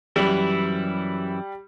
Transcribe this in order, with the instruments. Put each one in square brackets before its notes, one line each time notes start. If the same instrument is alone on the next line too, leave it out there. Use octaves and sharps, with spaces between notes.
[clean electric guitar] F#2 E3 E4 [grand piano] G3